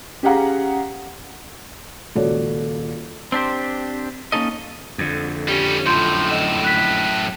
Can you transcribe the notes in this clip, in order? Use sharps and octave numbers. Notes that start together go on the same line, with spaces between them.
C#4 G4 G#4 F5 F#5 A#5
D#1 C#2 F#4 A4 C#5 D5
C4 D4 G4 C5
A#3 C#4 D#4 A4 D#5
F2 D3
G3 C#4 G4 G7
F#2 A2 F4 C6 G6
D#5 E7
F#6 B6